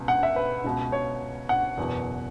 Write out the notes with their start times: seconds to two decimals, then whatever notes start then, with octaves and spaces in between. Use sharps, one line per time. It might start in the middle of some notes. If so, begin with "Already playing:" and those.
Already playing: C#2 B2
0.08 F#5
0.23 E5
0.36 B4
0.64 C#2 B2
0.92 C#5
1.49 F#5
1.77 F#1 E2 B2